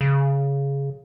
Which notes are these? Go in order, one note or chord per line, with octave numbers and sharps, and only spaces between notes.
C#3